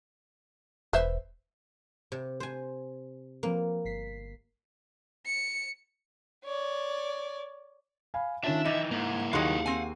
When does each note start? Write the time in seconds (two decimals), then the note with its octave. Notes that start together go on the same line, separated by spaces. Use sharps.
0.93 E1 B4 C5 E5
2.12 C3
2.40 C5 G#5
3.43 F3 A#3 C4 B4
3.85 G1 B6 C7
5.26 C#7
6.45 C#5 D5
8.14 F5 G#5 B5
8.44 D#3 C#4 D4 F4 E5 A5
8.65 D#3 E3 D#4 D6
8.91 G#2 A#3 E4
9.33 D#2 D#3 F#3 G#4 F5 F#5 C6
9.66 C4 G#5